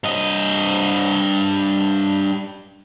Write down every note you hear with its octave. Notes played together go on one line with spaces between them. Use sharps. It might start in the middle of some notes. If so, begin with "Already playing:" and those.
G2 D#5